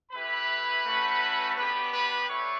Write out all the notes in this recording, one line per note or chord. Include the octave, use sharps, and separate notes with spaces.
A3 E4 G4 B4 B5
A3 C#4 F#4
B3 D4 G4 B4 B5
B4 B5
A3 D4 C#5 C#6